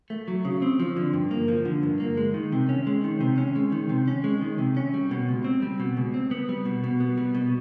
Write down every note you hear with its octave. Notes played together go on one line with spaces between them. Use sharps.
A3
F#3
C#3
C4
F3
D3
G2
A#3
F3
D3
G2
A#3
G#3
D#3
C3
C#4
G#3
D#3
C3
C#4
G#3
D#3
C3
C#4
G#3
D#3
C3
C#4
G3
B2
C#2
C4
G3
B2
C#2
C4
B3
G3
B2
B2
B3
G3
B2